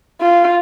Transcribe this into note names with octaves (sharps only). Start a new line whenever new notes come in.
F4